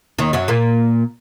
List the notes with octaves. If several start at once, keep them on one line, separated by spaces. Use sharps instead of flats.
D#2 D#3
F#2 F#3
A#2 A#3